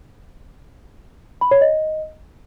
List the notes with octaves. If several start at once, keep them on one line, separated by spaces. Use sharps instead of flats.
B5
C#5
D#5